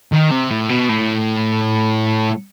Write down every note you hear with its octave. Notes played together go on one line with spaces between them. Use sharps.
D#3
C3
A2
B2
A2